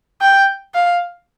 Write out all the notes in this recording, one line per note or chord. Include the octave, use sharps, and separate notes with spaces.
G5
F5